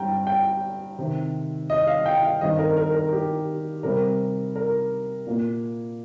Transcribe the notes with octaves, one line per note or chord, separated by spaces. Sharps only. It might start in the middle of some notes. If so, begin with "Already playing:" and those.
Already playing: G2 G3 C4 G5 A#5
G5
C3 D#3 C4
D#5
F5
G5
F5
G2 D#3 C4 D#5
A#4
A#4
A#4
G4
C3 G3 C4 A#4
A#4
A#2 A#3